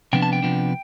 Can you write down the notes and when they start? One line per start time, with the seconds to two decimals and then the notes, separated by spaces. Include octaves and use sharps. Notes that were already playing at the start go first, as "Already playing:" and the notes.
0.13 C3 F3 B3 D4 G5
0.22 A5
0.33 G5
0.43 C3 F3 B3 D4